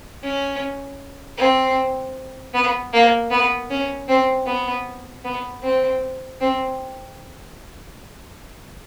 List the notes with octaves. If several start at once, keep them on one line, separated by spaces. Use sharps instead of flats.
C#4
C4
B3
A#3
B3
C#4
C4
B3
B3
C4
C4